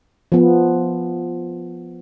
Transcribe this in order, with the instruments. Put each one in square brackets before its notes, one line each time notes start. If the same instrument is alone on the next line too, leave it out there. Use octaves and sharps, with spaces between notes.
[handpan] F3 B3